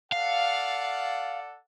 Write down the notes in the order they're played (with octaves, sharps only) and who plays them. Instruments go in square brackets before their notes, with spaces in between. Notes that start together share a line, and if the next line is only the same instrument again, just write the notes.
[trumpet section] A4 D5 F#5 [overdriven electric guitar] F5